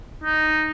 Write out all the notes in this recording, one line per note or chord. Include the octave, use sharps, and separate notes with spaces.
D#4